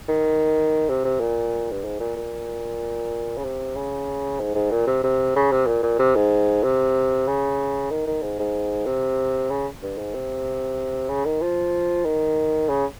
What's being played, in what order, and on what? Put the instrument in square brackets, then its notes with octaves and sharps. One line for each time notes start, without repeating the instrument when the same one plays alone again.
[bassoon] D#3
C3
C3
A#2
G2
G#2
A#2
A#2
C#3
C3
C#3
G#2
G#2
A#2
C3
C3
C#3
C3
A#2
A#2
C3
G#2
C3
C#3
D#3
D#3
G#2
G#2
C3
C#3
G2
G#2
C3
C#3
D#3
F3
D#3
C#3